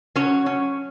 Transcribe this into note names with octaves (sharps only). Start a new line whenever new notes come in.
F#3 C#4 C#5
C#4